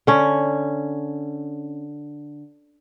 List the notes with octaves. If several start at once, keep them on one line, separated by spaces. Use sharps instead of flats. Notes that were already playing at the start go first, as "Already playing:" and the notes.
D3 C#4